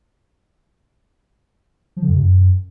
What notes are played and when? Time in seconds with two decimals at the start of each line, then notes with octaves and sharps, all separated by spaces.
1.97 F3
2.02 D3
2.08 F2
2.14 C3
2.20 F#2